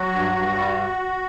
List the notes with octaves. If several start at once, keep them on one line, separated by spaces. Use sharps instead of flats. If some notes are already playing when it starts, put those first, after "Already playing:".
Already playing: F#3 F#4
G2
G2
G3